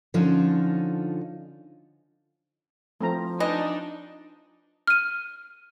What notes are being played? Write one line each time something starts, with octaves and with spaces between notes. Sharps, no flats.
D3 F3 C#4 D#4 F4 A4
F3 A3 C4 A#5
E3 D4 D#4 D#5
F6 D#7